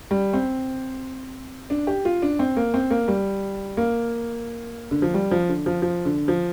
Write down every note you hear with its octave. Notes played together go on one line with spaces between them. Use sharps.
G3
C4
D4
G4
F4
D4
C4
A#3
C4
A#3
G3
A#3
D3
F3
G3
F3
D3
F3
F3
D3
F3